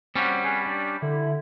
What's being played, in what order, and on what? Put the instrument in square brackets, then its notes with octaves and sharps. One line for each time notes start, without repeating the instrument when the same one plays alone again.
[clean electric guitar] G3 C#4 [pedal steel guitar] C4 F#4 F#5
[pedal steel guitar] G#4 B4
D4 G4
[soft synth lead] D3 [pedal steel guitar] E4